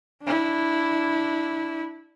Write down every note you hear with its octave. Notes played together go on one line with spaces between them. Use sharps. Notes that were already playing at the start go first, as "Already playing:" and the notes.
D4 E4